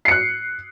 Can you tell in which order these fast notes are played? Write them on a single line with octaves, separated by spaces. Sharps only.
C7 C#7 F#6